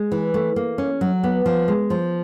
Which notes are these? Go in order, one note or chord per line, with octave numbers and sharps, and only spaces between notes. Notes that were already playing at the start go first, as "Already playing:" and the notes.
Already playing: G#3
E3
A3
A#3
C#4
F#3
B3
F3
G#3
F3